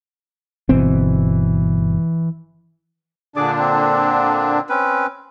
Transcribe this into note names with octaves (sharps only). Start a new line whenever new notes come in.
G1 B2 E3 C4
A#2 D3 D4 G#4 D5 D6
C4
C4 C#4 B4